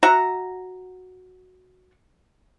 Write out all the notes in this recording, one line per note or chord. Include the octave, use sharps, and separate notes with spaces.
F#4 E5 F#5 A#5